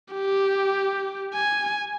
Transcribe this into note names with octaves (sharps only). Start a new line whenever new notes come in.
G4
G#5